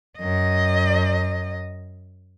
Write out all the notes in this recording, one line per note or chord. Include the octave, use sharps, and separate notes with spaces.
F#2 D#5